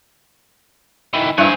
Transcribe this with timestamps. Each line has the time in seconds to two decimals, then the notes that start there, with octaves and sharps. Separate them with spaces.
1.14 D#3 E3
1.38 G2 E4 C5 G#5